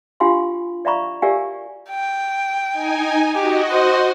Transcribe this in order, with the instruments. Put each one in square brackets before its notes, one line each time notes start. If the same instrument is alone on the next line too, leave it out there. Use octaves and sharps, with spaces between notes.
[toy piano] D4 F4 G4 F5 G#5 C6
D5 E5 F5 A#5 B5 C#6
G4 A#4 D5 E5 F5 G#5
[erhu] G5
[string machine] D#4 G#5
[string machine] F#4 D#5 [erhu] G4
[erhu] C5